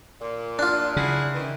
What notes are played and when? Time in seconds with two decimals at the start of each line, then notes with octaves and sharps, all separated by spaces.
0.21 A#2
0.59 D4 F4
0.96 C#3 E4 G#4 F#5
1.34 D#3 E3